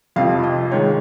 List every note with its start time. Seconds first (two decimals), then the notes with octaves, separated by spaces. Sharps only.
0.16 F2 C3 F3 F5
0.43 D#5
0.71 G#2 D#3 G#3 C#5